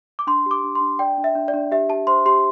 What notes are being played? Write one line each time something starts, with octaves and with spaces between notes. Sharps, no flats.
D6
D4 C6
G4 D6
D4
C6
D4
D5 G5
D4
E5
D4
D5
D4
G4 E5
G4 A5
C5 C6
G4 C6